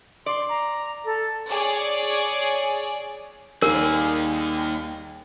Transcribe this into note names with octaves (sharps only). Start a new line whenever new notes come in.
D5 C6
A#5
A4
G#4 C#5 D5
D#2 D#3 G3 A#3 G#4 A#4